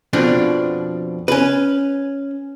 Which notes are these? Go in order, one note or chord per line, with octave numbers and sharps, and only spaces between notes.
F2 B2 F3 D4
C#4 B4